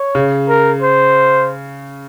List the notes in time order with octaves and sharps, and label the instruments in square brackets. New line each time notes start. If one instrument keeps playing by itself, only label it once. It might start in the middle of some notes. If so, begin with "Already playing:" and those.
Already playing: [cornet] C#5
[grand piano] C#3
[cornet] A#4
C5